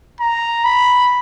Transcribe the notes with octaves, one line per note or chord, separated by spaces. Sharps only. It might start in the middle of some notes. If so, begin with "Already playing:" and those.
A#5
B5